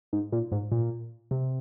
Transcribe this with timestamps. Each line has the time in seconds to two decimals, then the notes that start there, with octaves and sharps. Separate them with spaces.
0.13 G#2
0.32 A#2
0.52 G#2
0.72 A#2
1.31 C3